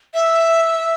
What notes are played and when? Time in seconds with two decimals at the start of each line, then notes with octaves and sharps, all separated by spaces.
0.14 E5